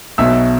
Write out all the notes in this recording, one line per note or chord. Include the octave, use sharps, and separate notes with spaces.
B1 B2 F#3 E5 E6